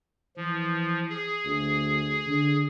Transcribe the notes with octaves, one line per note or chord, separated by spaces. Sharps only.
E3 F3
G#4
D2
D3